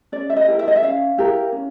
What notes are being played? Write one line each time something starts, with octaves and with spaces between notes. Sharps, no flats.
C#4 D5
E5
D#5
E4 G4 A#4
E5
D#5
E5
C#4 F5
E4 G4 A#4
C#4